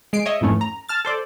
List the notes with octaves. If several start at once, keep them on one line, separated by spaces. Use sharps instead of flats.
G#3 C7 D7
C#5 D#5 E5
F2 G#2 E3 A3 C#4
A#5
A5 F6 A6
A4 C5 D5